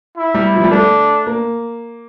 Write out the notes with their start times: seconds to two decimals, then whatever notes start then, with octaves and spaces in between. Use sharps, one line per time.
0.17 E4
0.34 G3
0.56 F3
0.64 G3
0.71 A3 D4
1.27 A#3